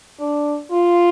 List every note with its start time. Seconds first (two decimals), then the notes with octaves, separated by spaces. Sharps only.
0.20 D4
0.71 F4